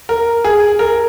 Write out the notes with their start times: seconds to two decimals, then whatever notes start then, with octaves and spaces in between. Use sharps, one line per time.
0.09 A#4
0.44 G#4
0.79 A#4